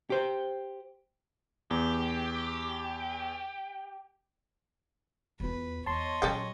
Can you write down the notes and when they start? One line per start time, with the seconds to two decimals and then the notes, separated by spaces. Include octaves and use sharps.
0.10 G4 C5
1.71 E2 G4
5.40 E2 F4 B4
5.86 E2 C#5 D#5 A5 C6
6.22 A#2 F#3 C#4 A4 G5